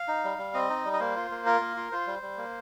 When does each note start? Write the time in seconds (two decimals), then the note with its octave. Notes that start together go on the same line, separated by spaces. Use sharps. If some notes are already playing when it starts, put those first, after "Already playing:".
Already playing: F5
0.08 D#4
0.24 G3
0.38 G3
0.54 C4 D#5
0.70 D#4
0.85 G3
0.93 D#5
1.00 A#3 C5
1.16 F4
1.31 A#3
1.46 F4 A#4
1.61 A#3
1.77 F4
1.92 F4 C5
2.07 G3
2.22 G3
2.38 A#3